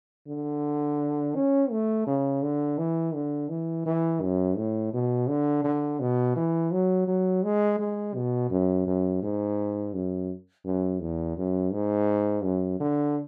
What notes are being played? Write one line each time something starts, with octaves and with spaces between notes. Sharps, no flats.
D3
C#4
A3
C#3
D3
E3
D3
E3
E3
F#2
A2
B2
D3
D3
B2
E3
F#3
F#3
G#3
G#3
B2
F#2
F#2
G#2
F#2
F#2
E2
F#2
G#2
F#2
D3